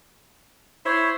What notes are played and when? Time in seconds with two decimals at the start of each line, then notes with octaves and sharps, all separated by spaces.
0.86 E4 C5 C#5